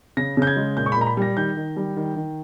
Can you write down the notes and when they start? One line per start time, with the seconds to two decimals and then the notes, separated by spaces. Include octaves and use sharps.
0.17 C#3 A#6
0.37 C#3 G6
0.47 G#6
0.57 G#3
0.77 A#2 G6
0.86 C#6
0.92 B5
0.96 A#2 A#5
1.07 B5
1.17 G3 A#6
1.37 D#3 G6
1.57 D#3
1.77 G3
1.97 D#3
2.16 D#3